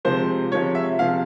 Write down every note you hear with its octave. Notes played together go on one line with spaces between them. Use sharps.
C3 F3 G#3 C5
C3 F3 G#3 C#5
E5
C3 F3 G#3 F5